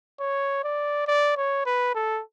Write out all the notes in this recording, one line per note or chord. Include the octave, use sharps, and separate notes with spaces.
C#5
D5
D5
C#5
B4
A4